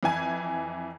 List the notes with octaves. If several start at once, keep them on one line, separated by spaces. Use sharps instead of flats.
F2 E3 G#5 G#6